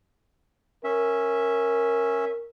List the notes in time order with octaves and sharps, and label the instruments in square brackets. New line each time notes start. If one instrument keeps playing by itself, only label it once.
[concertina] C#4 E5 [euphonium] A#4